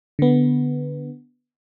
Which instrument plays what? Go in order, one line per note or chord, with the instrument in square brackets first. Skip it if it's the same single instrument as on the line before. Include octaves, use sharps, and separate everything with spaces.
[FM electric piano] D3 B3